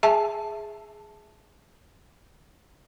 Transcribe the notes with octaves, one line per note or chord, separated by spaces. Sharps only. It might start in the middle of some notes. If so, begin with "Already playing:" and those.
G#4 E5 G#5 A5